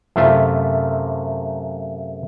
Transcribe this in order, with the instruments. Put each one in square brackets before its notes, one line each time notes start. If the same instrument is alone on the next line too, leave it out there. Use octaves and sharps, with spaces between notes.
[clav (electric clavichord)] F#2 C3 A3 F4 E5